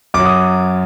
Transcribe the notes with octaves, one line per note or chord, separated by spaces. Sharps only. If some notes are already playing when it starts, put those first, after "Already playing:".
F#2 F#3 D6
D#6